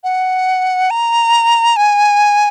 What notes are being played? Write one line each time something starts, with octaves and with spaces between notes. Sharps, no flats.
F#5
A#5
G#5